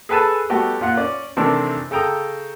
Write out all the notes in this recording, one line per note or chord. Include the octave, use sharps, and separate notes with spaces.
G#4 A4 B4 G#5 A5
G3 A3 B3 F#4 G4
A#2 F4 F#5
C#4 D5
C3 D#3 E3 A3 C4 D4
C#3 A4 G5 A#5 D#6